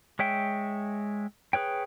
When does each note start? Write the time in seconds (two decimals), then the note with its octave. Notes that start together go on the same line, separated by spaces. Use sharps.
0.19 G#3 C#5 E5 G5
1.53 G#4 B4 C#5 G5